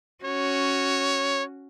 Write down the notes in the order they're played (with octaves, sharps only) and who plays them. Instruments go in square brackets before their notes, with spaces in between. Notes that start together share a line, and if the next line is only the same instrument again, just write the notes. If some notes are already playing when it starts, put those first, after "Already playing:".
[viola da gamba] C#4 F#4 [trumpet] C#5